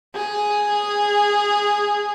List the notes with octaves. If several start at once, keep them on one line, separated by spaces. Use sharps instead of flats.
G#4